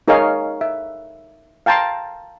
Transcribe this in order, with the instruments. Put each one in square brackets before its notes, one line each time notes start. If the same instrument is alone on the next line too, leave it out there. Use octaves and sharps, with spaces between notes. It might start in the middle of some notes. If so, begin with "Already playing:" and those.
[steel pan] D#4 G#4 A#4 C#5 D#5 F5
E5
F5 G5 A5 A#5 C6